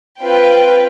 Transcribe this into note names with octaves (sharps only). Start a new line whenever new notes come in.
C4 F4 B4 G5